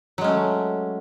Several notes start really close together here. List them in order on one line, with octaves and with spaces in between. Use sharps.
F#3 G#3 C#4 A3